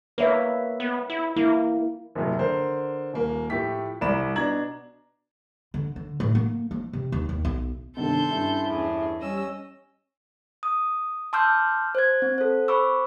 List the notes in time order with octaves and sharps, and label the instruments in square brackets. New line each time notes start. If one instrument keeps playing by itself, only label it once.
[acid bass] A#3 [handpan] B4 C#5 E5
[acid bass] B3
E4
[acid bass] A#3 [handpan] E4
[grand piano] F#1 A2 C3 F#3
D3 A#4 C5
D#1 A#3
A2 F3 A3 G4 B6
C2 D5 A#5 B5 E7
B2 D4 A#5 G#6 F#7
[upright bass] D3
D3
A2
A#3
F3
C3
D#2
D#2
B1
[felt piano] G1 C3 D#3 [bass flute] D4 [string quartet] A4 C6 G6
[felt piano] G2 [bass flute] C#4 [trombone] E4
[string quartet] E2 A2 G#4
[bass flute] G3 [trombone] C#4 [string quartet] D#5 E6
[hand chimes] D#6
A5 C6 D6 E6 F6 G6
C5 G#6
C4
A4 C5
C5 B5 C#6 D6 E6